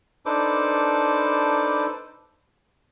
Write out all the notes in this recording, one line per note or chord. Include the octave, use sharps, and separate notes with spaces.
D4 D#4 A4 B4 C5 D6